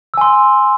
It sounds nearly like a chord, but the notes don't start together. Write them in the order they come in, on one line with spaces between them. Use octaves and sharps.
E6 G#5 C6